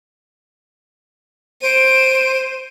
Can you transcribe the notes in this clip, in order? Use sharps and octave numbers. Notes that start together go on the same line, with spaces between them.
C5 D7 D#7